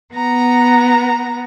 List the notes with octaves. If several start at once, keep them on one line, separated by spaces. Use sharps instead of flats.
B3 A#5